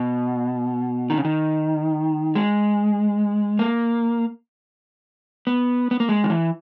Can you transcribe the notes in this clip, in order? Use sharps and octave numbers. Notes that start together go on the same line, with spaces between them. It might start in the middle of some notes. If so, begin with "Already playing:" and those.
Already playing: B2
D#3
C#3
D#3
G#3
A#3
B3
B3
A#3
G#3
D#3
E3